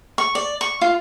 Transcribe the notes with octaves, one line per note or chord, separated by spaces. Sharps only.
C#6
D5
C#6
F4